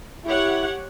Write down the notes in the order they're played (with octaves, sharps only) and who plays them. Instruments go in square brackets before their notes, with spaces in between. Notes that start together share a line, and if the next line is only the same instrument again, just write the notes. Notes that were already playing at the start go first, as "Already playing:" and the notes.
[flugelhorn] E4 [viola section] G4 C#5 F#5